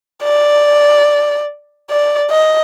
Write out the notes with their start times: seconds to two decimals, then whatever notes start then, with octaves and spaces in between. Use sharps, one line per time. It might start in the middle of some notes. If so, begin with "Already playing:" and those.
0.23 D5
1.90 D5
2.31 D#5